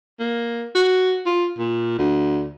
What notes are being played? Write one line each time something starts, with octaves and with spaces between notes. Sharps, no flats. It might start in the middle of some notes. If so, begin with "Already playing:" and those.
A#3
F#4
F4
A#2
D2